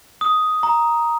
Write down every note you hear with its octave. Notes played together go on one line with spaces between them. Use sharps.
D#6
A#5